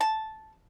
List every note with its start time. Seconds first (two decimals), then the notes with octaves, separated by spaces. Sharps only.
0.01 A5